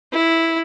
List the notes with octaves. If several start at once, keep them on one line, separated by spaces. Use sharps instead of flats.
E4